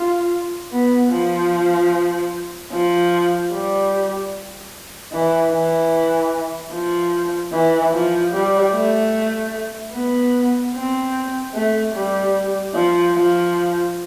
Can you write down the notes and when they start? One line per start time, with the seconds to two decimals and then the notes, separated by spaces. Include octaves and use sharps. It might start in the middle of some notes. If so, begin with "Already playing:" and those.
Already playing: F4
0.72 B3
1.11 F3
2.72 F3
3.52 G3
5.13 E3
5.53 E3
6.72 F3
7.53 E3
7.94 F3
8.33 G3
8.73 A3
9.93 B3
10.75 C4
11.54 A3
11.94 G3
12.74 F3
13.15 F3